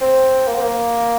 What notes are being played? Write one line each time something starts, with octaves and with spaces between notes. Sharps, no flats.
C4
A#3
C4
A#3